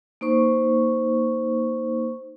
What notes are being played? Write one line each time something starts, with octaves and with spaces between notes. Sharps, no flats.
A#3 D#4 C5 C#6